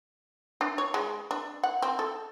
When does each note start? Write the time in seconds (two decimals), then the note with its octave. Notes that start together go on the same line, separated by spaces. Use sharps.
0.61 D4
0.78 C#5
0.94 G#3
1.31 D4
1.64 F#5
1.82 C4
1.99 A4